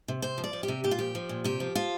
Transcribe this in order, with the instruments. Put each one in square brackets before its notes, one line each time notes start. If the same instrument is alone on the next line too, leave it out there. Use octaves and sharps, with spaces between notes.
[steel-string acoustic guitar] C3
C3 C5
F3
D5
F3
G4
C3
A#2 G4
F4
F3 G4
F3
A#2
C3 G4
F3
F3 F4